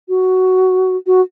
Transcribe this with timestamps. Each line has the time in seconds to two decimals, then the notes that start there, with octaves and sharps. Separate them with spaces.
0.09 F#4
1.07 F#4